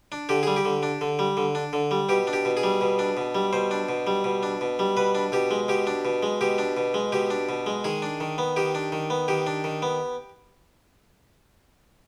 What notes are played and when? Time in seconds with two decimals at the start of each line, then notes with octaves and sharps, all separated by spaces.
0.12 D4
0.29 D3 G4
0.43 G3 G#4
0.56 G4
0.65 D3
0.83 D4
1.01 D3
1.19 G3
1.37 D3
1.55 D4
1.73 D3
1.91 G3
2.09 B2 G4
2.27 D4
2.33 G4
2.45 B2
2.57 G#4
2.63 G3
2.81 B2
2.99 D4
3.17 B2
3.35 G3
3.53 B2 C5
3.71 D4
3.89 B2
4.07 G3
4.24 B2
4.43 D4
4.61 B2
4.79 G3
4.97 B2 B4
5.15 D4
5.32 B2 G4
5.51 G#3
5.69 B2 G4
5.87 D4
6.05 B2
6.23 G#3
6.41 B2 G4
6.58 D4
6.77 B2
6.94 G#3
7.12 B2 G4
7.30 D4
7.49 B2
7.66 G#3
7.84 D#3 G#4
8.02 D4
8.20 D#3
8.38 B3
8.56 D#3 G4
8.75 D4
8.92 D#3
9.10 B3
9.28 D#3 G4
9.47 D4
9.64 D#3
9.82 B3